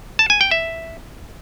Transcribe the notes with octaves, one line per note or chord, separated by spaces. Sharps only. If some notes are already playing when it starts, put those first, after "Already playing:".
A5
G#5
G5
E5